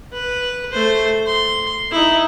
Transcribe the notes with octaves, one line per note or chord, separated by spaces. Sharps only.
B4
A3 C5
C6
D#4 E4